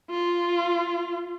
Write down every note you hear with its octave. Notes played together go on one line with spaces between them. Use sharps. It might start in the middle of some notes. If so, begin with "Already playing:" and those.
F4